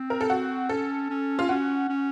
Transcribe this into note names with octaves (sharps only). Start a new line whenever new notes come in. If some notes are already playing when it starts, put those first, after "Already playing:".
Already playing: C4
A#4
A4
F#4
C#4 A4
C#4
F4
C#4 F#4
C#4